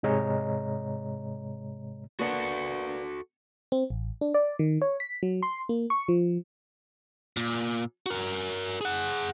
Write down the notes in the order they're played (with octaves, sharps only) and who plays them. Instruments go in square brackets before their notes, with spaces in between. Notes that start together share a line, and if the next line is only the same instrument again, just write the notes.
[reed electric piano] G#2 C3 G#3 C#5 D#5 A#5
[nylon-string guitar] A#3 B3 D4 [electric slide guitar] F#4 A4 F#5
[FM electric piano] C4
A1
D4
D5
D#3
C#5
B6
F#3
C6
A#3
C#6
F3
[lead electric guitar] A#2
F#4 A#4
G#4 F#5